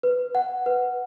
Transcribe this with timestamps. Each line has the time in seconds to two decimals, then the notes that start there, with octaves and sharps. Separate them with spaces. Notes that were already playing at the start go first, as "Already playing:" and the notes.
0.03 B4
0.35 F#5
0.66 B4